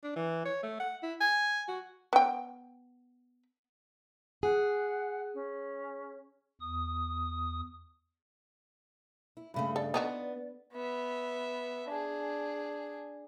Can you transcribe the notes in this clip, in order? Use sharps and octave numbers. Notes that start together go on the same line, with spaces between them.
D4
E3
C#5
A3
F#5
E4
G#5
F#4
B3 G5
G#4 F#5
C#4
E2 D#6
E4
G2 C#3 A3 B5
A4 D5
B3 D#4 F4 F#4
B3 E5
D4 G#4